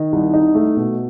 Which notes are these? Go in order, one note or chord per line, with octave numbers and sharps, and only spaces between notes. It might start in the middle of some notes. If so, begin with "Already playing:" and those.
Already playing: D#3 D#5
C2
D#4
A3
B2